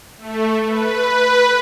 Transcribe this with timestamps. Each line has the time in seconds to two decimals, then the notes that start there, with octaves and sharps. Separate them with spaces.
0.18 A3
0.65 B4